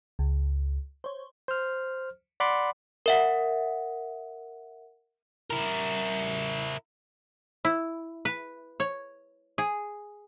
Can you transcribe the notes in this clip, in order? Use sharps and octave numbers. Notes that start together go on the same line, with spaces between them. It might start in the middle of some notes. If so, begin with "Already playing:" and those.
C#2
C5 C#5
C5 F6
D5 F#5 B5 C6 D6
A#4 E5 F#5
E4 A#4
E4
B4
C#5
G#4